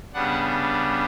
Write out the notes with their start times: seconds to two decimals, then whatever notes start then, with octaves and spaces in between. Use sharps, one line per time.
0.14 C#3 G3 B3 D4 F#5